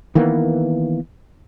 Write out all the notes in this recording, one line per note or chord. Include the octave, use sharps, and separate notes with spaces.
D#3 E3 A#3 B3